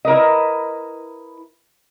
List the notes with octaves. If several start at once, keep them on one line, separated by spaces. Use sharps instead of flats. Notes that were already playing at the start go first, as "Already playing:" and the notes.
E4 A#4 B4 D#5